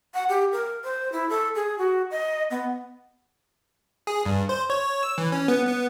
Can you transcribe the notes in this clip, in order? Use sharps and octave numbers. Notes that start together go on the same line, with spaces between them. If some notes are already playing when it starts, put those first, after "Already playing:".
F#5
G4
A#4
C5
E4
A4
G#4
F#4
D#5
B3
G#4
G2
C5
C#5
E6
E3
C#4
B3
B3